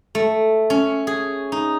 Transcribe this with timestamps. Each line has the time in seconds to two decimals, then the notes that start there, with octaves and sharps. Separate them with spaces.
0.15 A3
0.70 C#4
1.07 G#4
1.52 D#4